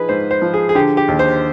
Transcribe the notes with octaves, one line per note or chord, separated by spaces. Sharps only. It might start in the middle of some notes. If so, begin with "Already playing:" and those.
Already playing: F3 D#4 G#4 B4
G#2 C5
C5
F3
G#4
G#4
D3 G4
G4
D#2
C5